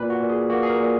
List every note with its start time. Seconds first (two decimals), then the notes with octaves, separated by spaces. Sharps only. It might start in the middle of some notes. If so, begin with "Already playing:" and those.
Already playing: A#2 B4
0.10 F#4
0.19 A#2
0.29 G#4
0.50 A#3 F#4
0.63 G#4
0.70 A#4
0.79 A#2